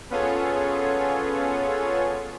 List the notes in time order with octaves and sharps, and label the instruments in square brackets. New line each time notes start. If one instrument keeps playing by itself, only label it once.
[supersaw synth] B3 C#4 F4 G#4 A4 C#5